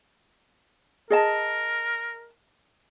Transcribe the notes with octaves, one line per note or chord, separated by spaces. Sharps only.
G#4 A#4 D#5 A5